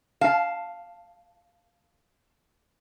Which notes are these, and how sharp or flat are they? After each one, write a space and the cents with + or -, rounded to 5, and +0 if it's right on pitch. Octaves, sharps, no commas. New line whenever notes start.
F5 +0 A5 +0